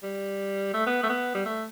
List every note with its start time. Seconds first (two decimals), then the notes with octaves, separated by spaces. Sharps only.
0.03 G3
0.74 A3
0.87 B3
1.03 A3
1.09 B3
1.35 G3
1.45 A3